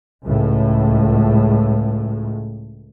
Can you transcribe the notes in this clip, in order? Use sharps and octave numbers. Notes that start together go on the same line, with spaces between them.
C#2 A2